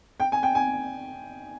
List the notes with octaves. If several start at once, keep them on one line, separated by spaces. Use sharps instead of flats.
G5
G#5
G5
G#5